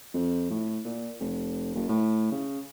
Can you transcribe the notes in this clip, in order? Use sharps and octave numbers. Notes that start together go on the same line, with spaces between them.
F2
A2
A#2
F1
F#1
A2
C#3